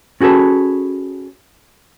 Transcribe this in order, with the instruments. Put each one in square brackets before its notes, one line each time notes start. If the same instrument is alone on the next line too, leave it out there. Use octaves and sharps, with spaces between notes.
[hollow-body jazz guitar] C#4 F#4 G#4 A4 B4